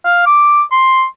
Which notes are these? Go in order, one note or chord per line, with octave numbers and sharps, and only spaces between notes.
F5
D6
C6